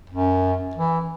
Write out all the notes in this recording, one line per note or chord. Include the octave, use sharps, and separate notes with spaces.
F#2
E3